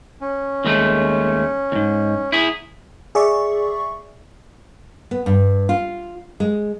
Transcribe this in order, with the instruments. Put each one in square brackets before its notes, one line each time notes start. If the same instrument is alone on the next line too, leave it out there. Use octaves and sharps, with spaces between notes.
[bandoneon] C#4
[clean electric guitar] D#2 G#3 A3
D#2 G#2
[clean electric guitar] E4 G#4 [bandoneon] D#6
[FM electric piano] G#4 D5 E5 C#6
[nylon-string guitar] B3
G2
F4
G#3